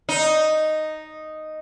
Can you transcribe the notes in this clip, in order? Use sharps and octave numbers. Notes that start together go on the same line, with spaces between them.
D#4